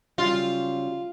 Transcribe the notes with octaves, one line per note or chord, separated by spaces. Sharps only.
C#3 F#3 G3 F4